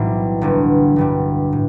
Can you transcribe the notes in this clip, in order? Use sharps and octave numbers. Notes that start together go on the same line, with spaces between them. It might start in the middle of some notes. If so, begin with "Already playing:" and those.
Already playing: B1 A2 E3 G3 C4
G1 G2 D3 G3
G1 G2 D3 G3
A2